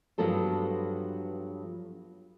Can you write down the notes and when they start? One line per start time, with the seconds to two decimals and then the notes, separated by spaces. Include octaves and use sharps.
0.18 G2 F3 F#3 B3 A4 C5